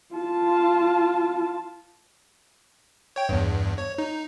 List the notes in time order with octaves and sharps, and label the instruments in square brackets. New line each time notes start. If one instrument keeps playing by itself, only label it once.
[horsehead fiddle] F4 A5
[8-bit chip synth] C#5 G5
E2 G2
C#5
D#4